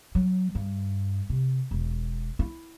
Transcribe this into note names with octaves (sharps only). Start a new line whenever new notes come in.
F#3
G2
C3
E1
E4